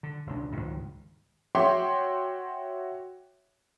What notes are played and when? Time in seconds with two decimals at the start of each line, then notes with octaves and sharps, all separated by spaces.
0.03 D3
0.27 E1 C#2 D4
0.57 C#2 G#2 D#3
1.55 F#4 C#5 E5 G5 C6 D6